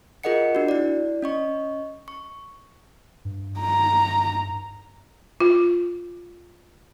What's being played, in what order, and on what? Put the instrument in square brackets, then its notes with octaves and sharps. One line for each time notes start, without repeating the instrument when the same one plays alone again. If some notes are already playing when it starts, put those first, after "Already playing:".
[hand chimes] F4 G#4 A#4 D#5 F#5 C#7
D4 F#4
E4 D5
C#4 D#5 C#6
C#6
[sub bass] G2
[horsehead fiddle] A#5
[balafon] F4